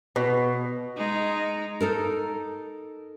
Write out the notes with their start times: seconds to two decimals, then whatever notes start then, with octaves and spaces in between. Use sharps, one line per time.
0.16 B2
0.97 G#3 D#4
1.81 D#4 A4 A#4